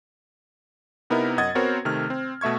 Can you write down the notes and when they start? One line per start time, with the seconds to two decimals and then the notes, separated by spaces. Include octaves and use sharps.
1.10 C3 B3 D#4 E4 A#4
1.38 F#2 D#5 F#5 D#6 G#6 A6
1.55 B3 C4 F#4 A#4 C5 C#5
1.85 C3 D#3 A3 F6
2.10 C4
2.41 B2 A3 E5 C#6 G#6